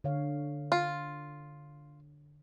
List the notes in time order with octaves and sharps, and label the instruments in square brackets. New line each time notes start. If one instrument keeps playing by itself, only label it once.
[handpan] D3 C#5 F5
[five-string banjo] F4